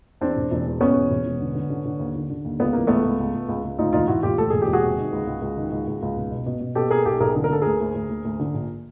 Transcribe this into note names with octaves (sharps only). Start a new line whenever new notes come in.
E2 C4 D4
E1
E1
E2
B2 B3 C#4
E2
E1
E1
D3
D3
D3
D3
D#2
D3
D3
D#2
C#2 B3
E3 A#3
C#2 A3 B3
C#2
C#2
C#2
C#2
C#2
D2 D#4 F4
E1 D#4 F4
E1 E4 F#4
E1 F4 G4
D2 A4
E1 G#4
G4
E1
F#4 G#4
C3
D#3
C#2
C#2
C#2
D#3
C#2
C#2
C#2
B1
B2
B2
B2
B2 G4 A4
B2 G#4 A#4
B1 G4 A4
B1 G#4 A#4
D3
A#4
D3 A4
D2 G#4 A#4
D2
D2
D2
D2
D3
A#1